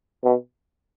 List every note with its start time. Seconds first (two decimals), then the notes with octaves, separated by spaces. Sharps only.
0.24 B2